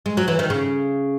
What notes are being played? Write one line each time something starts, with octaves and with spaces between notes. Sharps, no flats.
G#3
F#3
E3
D#3
C#3